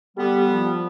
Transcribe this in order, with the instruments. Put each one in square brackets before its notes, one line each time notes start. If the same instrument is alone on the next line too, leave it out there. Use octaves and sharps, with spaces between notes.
[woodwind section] D3 G3 B3 [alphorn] G4
[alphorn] F3